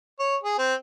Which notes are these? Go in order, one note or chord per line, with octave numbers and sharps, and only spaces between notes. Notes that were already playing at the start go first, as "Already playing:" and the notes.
C#5
G#4
C4